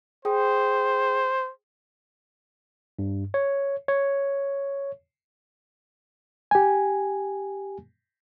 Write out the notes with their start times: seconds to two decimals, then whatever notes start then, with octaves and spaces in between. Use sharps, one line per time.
0.25 G#4 C5 G5 D#6
2.99 G2
3.34 C#5
3.88 C#5
6.51 G4 G#5